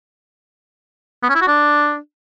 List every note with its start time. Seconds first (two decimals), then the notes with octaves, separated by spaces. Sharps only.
1.23 B3
1.29 C#4
1.35 E4
1.41 F#4
1.47 D4